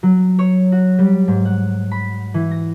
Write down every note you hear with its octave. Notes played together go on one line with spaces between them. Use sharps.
F#3
C#5
F#4
G3
G#2
F#5
B5
E3
A#6